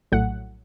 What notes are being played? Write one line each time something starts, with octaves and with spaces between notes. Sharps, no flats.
A#1 A2 F#3 A3 F#5